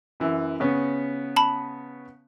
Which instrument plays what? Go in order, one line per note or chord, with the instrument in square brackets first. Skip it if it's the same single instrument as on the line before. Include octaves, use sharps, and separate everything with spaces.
[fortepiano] F#2 E3
C#3 B3 C#4
[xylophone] A5 B5